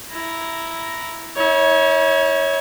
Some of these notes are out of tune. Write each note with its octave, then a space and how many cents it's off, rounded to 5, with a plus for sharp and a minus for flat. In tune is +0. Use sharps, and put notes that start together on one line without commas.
E4 +0 A#5 +0
E4 -45 C#5 +0